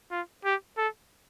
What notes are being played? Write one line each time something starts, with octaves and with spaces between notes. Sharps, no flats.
F4
G4
A4